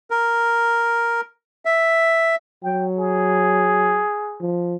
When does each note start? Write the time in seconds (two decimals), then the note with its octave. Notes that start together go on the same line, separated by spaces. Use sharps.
0.10 A#4
1.65 E5
2.64 F#3 G5
2.98 G#4
4.41 F3